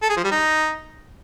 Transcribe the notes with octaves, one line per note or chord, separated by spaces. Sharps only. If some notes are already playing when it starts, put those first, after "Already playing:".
A4
G#4
F3
G3
D#4